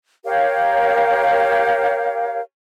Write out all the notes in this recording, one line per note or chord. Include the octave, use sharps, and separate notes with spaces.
G4 A#4 C#5 F5